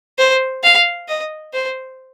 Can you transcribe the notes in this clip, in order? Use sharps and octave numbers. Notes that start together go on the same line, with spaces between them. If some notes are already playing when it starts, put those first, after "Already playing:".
C5
F5
D#5
C5